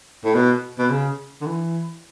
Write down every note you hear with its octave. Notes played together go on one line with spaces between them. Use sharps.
A2
B2
B2
C#3
D3
E3